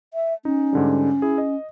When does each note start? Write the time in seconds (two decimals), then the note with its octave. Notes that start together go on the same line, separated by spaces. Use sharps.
0.14 E5
0.45 C#4 D#4
0.73 G#2 D3 G3
1.22 E4 G#4
1.38 D#5